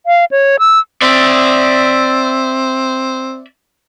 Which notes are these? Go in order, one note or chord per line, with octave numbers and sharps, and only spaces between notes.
F5
C#5
E6
C4 D5 E5